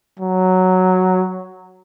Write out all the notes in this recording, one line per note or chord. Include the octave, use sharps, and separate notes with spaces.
F#3